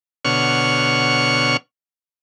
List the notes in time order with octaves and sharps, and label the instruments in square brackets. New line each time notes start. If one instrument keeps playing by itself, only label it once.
[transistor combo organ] B2 D3 C#5 F#5 C#6 F6